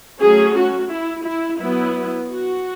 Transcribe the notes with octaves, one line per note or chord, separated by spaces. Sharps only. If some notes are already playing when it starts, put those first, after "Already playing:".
F#3 A3 C#4 G#4
F#4
E4
E4
F#3 B3 E4
F#4